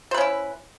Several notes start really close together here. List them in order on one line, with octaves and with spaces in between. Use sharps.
C5 B4 C#4 E4